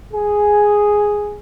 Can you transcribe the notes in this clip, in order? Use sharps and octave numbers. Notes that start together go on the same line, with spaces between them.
G#4